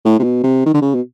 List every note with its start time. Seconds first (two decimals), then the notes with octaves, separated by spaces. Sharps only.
0.05 A2
0.19 C3
0.23 B2
0.44 C3
0.66 D#3
0.74 D3
0.82 C#3
0.95 B2